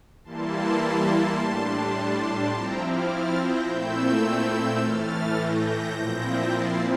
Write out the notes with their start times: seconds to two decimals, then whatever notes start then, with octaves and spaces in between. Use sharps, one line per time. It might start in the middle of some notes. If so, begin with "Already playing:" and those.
0.24 E3 G3 A#3 E4 A5 C6
1.38 A2 G3 D4
2.51 F3 C4 E4 G5 A#5
2.80 D6 F6
3.09 F6 A6
3.37 G6 A#6
3.65 A#2 A3 C4 E4 E6 G6
4.79 A2 E3 A3 F6 A6
5.36 G6 A#6
5.93 A#2 F3 C4 E4
6.49 A6 C7